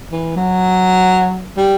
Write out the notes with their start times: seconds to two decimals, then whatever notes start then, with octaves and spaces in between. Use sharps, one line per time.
0.12 E3
0.36 F#3
1.57 G3